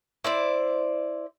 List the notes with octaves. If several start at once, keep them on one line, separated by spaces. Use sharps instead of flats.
E4 C5 D5